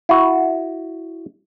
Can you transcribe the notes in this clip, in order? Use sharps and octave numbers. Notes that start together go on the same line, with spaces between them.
E4 F#4